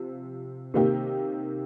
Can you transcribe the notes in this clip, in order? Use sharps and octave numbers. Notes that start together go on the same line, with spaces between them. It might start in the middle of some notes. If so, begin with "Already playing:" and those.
Already playing: C3 F3
C3 D#3 A#3 D#4 G4